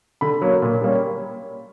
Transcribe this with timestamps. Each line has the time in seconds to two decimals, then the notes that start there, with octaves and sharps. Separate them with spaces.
0.21 D3 B5
0.41 F#3 A#3 C#4
0.62 A#2
0.82 G3 A#3 C#4